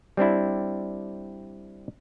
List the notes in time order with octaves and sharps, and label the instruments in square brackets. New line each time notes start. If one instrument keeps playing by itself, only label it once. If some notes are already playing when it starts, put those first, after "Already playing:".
[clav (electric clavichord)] G3 C4 D4 E4